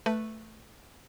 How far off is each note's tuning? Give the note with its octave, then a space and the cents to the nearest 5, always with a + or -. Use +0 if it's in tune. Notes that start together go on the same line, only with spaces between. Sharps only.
A3 +0 B4 +0